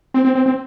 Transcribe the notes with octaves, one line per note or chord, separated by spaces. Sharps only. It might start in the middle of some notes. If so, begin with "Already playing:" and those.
C4
C4
C4
C4